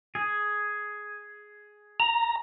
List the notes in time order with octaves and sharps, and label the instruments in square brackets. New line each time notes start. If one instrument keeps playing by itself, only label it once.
[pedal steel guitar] G#4
[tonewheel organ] A#5